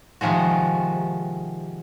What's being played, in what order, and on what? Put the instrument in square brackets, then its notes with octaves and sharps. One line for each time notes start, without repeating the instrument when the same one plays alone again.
[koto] C3 D#3 F3 G#3 F#4